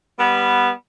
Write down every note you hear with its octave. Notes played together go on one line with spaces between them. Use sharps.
G3 B3